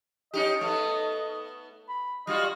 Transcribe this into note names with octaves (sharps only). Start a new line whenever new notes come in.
C#4 D#4 G4 D#5
A3 B3
B5
G3 F4 F#4 D#5